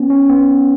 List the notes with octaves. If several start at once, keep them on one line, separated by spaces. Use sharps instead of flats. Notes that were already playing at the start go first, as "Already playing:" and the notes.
Already playing: B3 C#4
C#4
B3